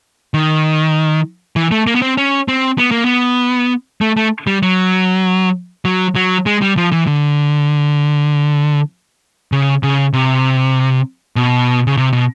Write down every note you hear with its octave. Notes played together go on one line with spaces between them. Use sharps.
D#3
E3
A3
A#3
B3
C4
C#4
C4
B3
A#3
B3
A3
A3
G3
F#3
F#3
F#3
G#3
G3
F3
E3
D3
C#3
C#3
C3
B2
C#3
C3
B2